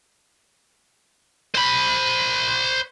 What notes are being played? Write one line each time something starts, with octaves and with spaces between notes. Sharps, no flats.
C5 B5